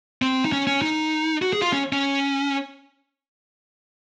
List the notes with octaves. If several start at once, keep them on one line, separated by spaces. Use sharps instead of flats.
C4
D#4
C#4
C#4
D#4
F#4
G#4
F4
C#4
C#4